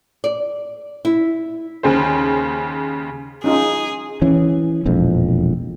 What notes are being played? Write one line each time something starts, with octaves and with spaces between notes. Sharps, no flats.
D5
E4
D#2 C#3 G#4 C5
C#4 D#4 F4 G#4
E3 C#4
E1 A#1 F2